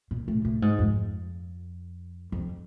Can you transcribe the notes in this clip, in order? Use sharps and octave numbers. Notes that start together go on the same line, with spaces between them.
A#2
A2
A2
G#2
F2
F2